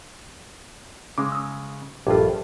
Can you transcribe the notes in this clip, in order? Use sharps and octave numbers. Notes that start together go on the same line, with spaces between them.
C#3 G#3 C#4 D6
D#6 E6
A#1 G2 F4 G4 A4